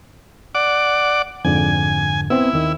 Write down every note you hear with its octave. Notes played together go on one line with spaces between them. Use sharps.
D5 F#5 D6
F2 G#2 D3 G#5
B3 C4 E4
D#2 D#3